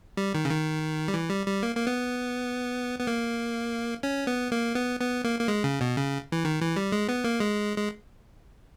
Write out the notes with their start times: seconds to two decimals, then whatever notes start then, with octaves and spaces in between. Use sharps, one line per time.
0.17 G3
0.35 D#3
0.45 C#3
0.50 D#3
1.08 G3
1.14 E3
1.30 G3
1.47 G3
1.63 A#3
1.76 A#3
1.87 B3
2.99 B3
3.07 A#3
4.03 C#4
4.27 B3
4.52 A#3
4.75 B3
5.00 B3
5.24 A#3
5.40 A#3
5.48 G#3
5.64 C#3
5.81 B2
5.97 C#3
6.32 E3
6.45 D#3
6.61 E3
6.76 G3
6.92 G#3
7.09 B3
7.24 A#3
7.40 G#3
7.77 G#3